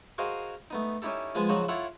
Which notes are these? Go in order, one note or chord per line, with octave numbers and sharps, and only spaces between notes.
F#4 G#4 A#4 C5 D#5 F5
A3 B3 D#4
C#4 D#4 E4 G4 A4
F3 G#3 B3 G#5 A5
C#3 F3 F#3 D#4 F#4
E4 F4 A4 C#5 F#5